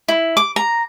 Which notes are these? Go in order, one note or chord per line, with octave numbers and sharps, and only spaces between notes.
E4
D6
A#5